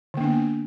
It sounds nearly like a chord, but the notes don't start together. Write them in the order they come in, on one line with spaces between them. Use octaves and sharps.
D3 A#3 D4 B3